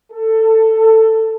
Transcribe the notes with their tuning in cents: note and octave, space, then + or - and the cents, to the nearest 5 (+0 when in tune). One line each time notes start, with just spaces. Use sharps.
A4 +15